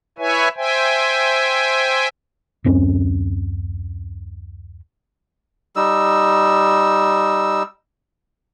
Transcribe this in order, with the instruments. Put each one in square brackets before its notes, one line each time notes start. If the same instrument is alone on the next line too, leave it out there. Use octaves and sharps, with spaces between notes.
[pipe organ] E4 B4 C#5 E5 G#5
C5 E5 G5 G#5
[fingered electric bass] D1 F#2 C4 C#4
[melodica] G3 D#4 E6